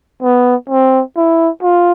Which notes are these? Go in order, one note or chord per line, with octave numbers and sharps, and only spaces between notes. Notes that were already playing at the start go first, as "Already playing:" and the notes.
B3
C4
E4
F4